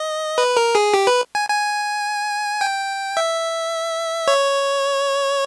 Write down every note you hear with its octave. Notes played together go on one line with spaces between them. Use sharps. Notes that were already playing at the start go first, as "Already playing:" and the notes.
Already playing: D#5
B4
A#4
G#4
G4
B4
G#5
G#5
G5
E5
C#5